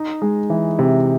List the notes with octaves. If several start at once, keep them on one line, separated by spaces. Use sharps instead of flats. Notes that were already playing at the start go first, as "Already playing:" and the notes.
Already playing: D#4
G#3
E3
C3